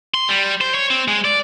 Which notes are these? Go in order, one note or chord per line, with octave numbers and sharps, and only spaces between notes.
C6
G3
C5
C#5
C4
G#3
D5